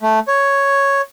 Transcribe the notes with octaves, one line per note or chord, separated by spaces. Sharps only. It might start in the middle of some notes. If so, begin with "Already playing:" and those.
A3
C#5